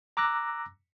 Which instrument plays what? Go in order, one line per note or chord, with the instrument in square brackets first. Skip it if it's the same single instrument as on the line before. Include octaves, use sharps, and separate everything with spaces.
[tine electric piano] A#5 D6 E6 F#6 A#6